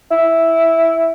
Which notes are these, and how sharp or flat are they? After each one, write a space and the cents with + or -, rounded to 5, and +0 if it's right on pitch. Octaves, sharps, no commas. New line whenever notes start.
E4 -5